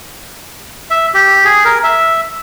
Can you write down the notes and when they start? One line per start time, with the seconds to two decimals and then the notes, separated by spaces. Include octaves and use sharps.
0.91 E5
1.14 G4
1.45 G#4
1.65 A#4
1.83 E5